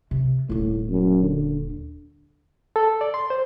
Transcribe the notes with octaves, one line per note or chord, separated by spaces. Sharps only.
C3
D#1 A2 A#3
F#2
D3
A4
D5
C6
C5